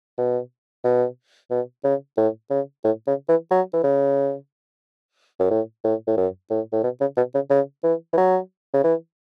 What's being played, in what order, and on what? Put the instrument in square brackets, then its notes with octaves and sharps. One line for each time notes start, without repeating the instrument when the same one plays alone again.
[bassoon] B2
B2
B2
C#3
A2
C#3
A2
C#3
E3
F#3
E3
C#3
F#2
A2
A2
A2
F#2
A2
A2
B2
C#3
B2
C#3
C#3
E3
E3
F#3
C#3
E3